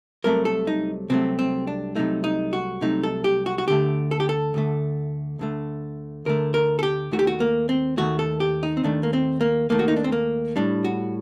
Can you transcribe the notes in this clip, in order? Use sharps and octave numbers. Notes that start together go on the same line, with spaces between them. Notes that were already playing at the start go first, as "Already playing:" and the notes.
C2 C3 F#3 A3 A#4
A4
D#4
C2 C3 F#3 A3 C4
C4
D4
C2 C3 F#3 A3 D#4
D#4
F#4
C2 C3 F#3 A3 D#4
A4
G4
F#4
F#4
D2 D3 A3 G4
A4
G4
A4
D2 D3 A3
D2 D3 A3
D2 D3 A3 A#4
A#4
A4
G4
D#2 D#3 A3 F#4
G4
F#4
A#3
C4
D#2 D#3 A3 F#4
A4
G4
D#4
C4
D#2 D#3 A3 D4
A#3
C4
A#3
D#2 D#3 A3 A#3
F#4
D#4
D4
C4
A#3
A2 G3 D4
F#4